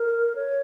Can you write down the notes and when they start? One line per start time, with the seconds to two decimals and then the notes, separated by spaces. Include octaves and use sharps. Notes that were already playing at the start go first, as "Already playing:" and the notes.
Already playing: A#4
0.35 C#5